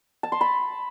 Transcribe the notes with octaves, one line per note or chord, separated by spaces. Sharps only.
A5
C6
B5